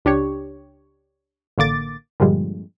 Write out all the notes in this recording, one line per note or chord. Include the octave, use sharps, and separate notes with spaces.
C#2 D4 G4 C#5
A1 D3 A#3 D6 A6
G2 A#2 D3 F3 G3 G#3